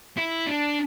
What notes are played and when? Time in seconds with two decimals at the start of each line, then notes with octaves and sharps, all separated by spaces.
0.17 E4
0.47 D4